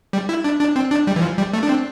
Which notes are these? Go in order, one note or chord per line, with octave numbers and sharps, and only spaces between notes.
G3
E4
D4
D4
C4
D4
G3
E3
F3
G3
A3
D4
C4